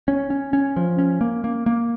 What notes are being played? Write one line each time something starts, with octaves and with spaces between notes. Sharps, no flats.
C#4
C#4
C#4
F3
C#4
A#3
A#3
A#3